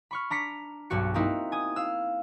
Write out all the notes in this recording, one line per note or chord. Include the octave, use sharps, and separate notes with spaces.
B5 C#6 F6
D4 A#5 B6 C#7
B1 G2 F#4 C#7
A#3 C4 D#4 E4 F#4
G#5 D#6
F5 E6